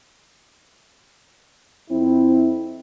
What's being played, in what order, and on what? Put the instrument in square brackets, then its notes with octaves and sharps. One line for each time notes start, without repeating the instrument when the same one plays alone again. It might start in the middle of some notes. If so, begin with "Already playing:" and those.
[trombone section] F2 C4 E4